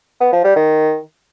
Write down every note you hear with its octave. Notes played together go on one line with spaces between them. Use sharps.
B3
F3
G3
D#3